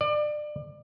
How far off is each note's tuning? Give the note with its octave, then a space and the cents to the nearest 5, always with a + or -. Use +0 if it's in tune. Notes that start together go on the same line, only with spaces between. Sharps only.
D5 +30